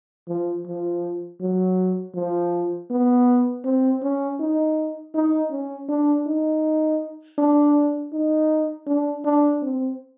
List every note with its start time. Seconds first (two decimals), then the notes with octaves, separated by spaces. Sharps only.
0.28 F3
0.66 F3
1.40 F#3
2.15 F3
2.90 B3
3.64 C4
4.02 C#4
4.39 D#4
5.14 D#4
5.51 C#4
5.89 D4
6.27 D#4
7.38 D4
8.12 D#4
8.87 D4
9.25 D4
9.62 C4